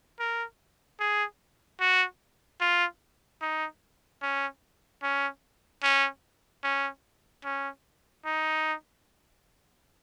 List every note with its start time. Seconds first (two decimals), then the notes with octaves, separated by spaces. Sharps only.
0.20 A#4
1.00 G#4
1.80 F#4
2.61 F4
3.41 D#4
4.22 C#4
5.03 C#4
5.83 C#4
6.64 C#4
7.45 C#4
8.25 D#4